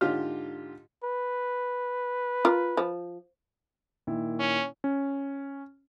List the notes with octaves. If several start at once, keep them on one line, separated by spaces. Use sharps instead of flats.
G#2 D3 F4 G4 F6
B4
F4 A#4
F3
A#2 D#3 E4
C#4
C#4